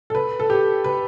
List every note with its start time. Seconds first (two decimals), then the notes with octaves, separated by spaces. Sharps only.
0.10 A4
0.15 B4
0.39 A4
0.50 G4
0.84 B4